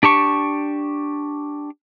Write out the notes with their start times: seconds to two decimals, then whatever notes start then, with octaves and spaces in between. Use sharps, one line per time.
0.03 D4 G4 A5 C#6